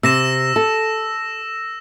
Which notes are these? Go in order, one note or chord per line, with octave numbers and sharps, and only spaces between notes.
C3 E6 A#6 E7
A4